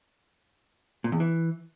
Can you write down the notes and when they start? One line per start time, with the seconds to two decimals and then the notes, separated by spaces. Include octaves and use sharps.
1.04 A#2
1.12 E2
1.20 E3